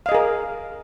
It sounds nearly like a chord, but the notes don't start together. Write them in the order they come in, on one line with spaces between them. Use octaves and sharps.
F5 D#5 G#4 A#4